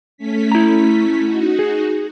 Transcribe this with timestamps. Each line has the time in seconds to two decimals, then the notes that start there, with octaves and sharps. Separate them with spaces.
0.17 A3 C#4 B6
0.52 E4 A#5
1.23 D#4 F#4
1.59 G#4